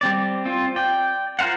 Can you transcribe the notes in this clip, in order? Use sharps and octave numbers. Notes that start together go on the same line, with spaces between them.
G3 C4 D5
C4 F4
D5 G5
F4 A#4 C5 F5 F#5